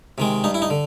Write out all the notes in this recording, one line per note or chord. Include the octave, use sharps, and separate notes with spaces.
C3 D#3 G#3
G2 D#4
E4
D#4
D3